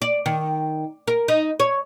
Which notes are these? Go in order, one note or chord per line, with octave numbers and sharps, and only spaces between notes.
D5
D#3
A#4
D#4
C#5